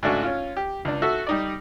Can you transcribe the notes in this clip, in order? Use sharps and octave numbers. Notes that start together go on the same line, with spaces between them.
G#2 C#3 A3 D4 F#4
C#4 F4
G4
C#2 D4
F#4 A4 E5
G3 D#4 D5